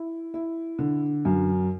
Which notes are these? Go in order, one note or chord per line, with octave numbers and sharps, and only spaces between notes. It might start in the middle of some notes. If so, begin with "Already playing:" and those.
Already playing: E4
E4
D3
F#2